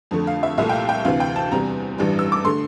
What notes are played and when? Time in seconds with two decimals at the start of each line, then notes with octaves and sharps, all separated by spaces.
0.11 F2 D3 A3
0.27 F5
0.43 E5
0.58 C2 A#2 A3 E5
0.69 G5
0.73 F5
0.89 G5
1.05 D2 C3 E3 F5
1.20 G5
1.36 A5
1.51 E2 C3 G3 A#5
1.98 A1 G2 E3 G3
2.19 E6
2.32 D6
2.45 D3 A3 C6